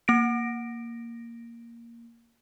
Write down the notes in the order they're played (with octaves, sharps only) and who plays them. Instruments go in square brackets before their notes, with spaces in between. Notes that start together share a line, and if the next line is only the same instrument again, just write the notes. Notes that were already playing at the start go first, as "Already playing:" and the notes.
[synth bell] A#3 A#6 D7